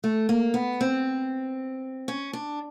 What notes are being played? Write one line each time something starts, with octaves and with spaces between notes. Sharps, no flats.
A3
A#3
B3
C4
C#4
D4